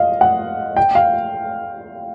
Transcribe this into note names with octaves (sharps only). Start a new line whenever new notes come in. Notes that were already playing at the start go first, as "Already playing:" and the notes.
Already playing: D#5 F5
F#5
G5
F5